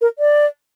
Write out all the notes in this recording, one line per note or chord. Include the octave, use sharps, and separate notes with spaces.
A#4
D5